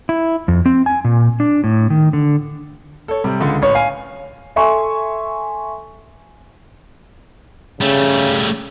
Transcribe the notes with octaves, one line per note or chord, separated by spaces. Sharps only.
E4
F2
C4
G#5
A#2
D4
A2
D#3
D3
A4 C#5
C3 G3
C#2 D3
A1 C#5
F5 G#5
A4 E5 G#5 C6 C#6
C#3 G3 A3